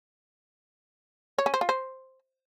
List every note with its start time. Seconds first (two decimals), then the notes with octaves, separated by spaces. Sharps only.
1.38 C#5
1.46 C#4
1.54 C5
1.61 F4
1.69 C5